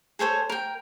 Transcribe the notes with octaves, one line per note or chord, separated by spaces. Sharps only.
G#4 A4 C5 C#5
A#4 G5